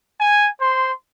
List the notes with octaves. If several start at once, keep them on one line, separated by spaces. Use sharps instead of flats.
G#5
C5 C6